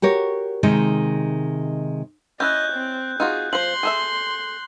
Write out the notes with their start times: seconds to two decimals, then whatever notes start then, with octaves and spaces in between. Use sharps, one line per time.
0.02 F#4 G4 A#4 C#5
0.63 C3 D#3 G#3 D#4
2.40 C#4 E4 D#5 F#6 G6
2.73 C4
3.20 D#4 F4 F#4 G#4
3.53 F3 C5 C6 F#7
3.83 G#4 A4 E5